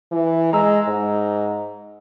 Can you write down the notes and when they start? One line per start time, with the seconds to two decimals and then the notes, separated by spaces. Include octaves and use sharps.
0.12 E3
0.53 G#3 A#5 E6
0.88 G#2